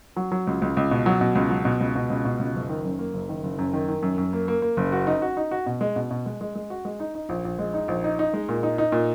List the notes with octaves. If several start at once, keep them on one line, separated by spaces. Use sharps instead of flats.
F#3
F#3
C#2
C#2
C#2
B2
F#3
B2
C#2
F#3
B2
C#2
B2
C#2
B2
C#2
F#1
D#3
F#2
A#3
F#1
D#3
F#1
F#2
D#3
D#3
F#2
F#2
A#3
A#3
A#3
F#1
F#4
D#4
F#4
D#4
F#4
B2
G#3
B2
B2
G#3
G#3
G#3
F#4
G#3
D#4
D#4
A#1
A#1
G#3
D#4
A#1
D#4
D#4
G#3
A#2
D#4
D#4
A#2